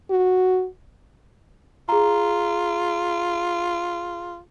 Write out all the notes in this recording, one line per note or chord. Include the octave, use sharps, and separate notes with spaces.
F#4
F4 G#4 A#5